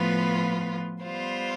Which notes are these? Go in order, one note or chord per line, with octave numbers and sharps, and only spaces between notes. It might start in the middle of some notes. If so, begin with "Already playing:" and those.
Already playing: A2 F3 B3 F4 B4
G3 B3 F4 C5